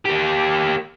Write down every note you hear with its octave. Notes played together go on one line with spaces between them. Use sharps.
A#3 G4